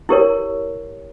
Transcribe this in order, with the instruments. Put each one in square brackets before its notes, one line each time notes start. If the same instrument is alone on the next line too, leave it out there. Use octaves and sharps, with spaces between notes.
[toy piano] E4 G4 A#4 C#5